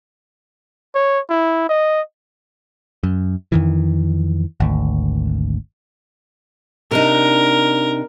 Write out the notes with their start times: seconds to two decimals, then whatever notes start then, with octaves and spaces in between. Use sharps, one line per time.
0.95 C#5
1.30 E4
1.69 D#5
3.03 F#2
3.52 F2 D#3 E3
4.60 G#1 D2
6.91 C3 D4 D#4 A#4